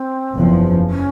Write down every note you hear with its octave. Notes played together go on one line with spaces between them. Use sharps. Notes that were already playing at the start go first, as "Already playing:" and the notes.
Already playing: C4
F#1 E2 C#3 F3
C#4